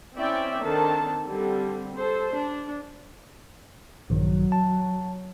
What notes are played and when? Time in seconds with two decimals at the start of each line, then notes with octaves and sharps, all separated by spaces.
0.17 C4 C#4 E4 D5 E5 G5
0.63 D#3 C4 D4 A4 A5
1.27 D3 G3 C4
1.97 A4 C5
2.34 D4
4.10 A#1 G2 D#3 F#3
4.52 A5